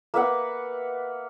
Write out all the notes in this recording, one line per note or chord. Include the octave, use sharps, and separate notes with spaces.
A#3 B4 E5 F#5